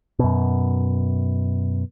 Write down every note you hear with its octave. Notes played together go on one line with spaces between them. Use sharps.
F#2 B2